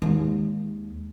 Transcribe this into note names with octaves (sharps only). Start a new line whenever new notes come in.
D#2 G#3